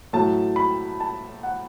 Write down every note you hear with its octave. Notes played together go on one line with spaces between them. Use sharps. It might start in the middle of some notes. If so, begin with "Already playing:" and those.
A2 F#3 A5
B5
A5
F#5